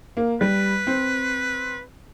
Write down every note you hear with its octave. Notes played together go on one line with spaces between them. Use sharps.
A#3
G3 B4
C4